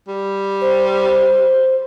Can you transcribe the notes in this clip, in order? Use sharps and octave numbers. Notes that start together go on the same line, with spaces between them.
G3
C5